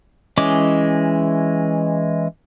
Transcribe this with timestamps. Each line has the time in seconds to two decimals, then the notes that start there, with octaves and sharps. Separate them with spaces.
0.38 E3 G#3 C#4 D#5 D6